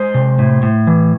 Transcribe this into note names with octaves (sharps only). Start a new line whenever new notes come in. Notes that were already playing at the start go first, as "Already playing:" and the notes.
Already playing: G#3 C5
C3
A2
A2
E3